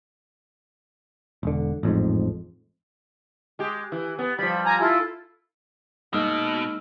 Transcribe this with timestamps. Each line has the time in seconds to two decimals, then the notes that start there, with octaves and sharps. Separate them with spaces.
1.43 E1 D3
1.83 A1 F2 G#2
3.59 G#3 G4
3.92 E3
4.19 B3
4.39 F3 G3 B5
4.65 G#5 A#5
4.81 E4 F4 A4
6.13 B2 G#3 A#3 D#4 E6 F6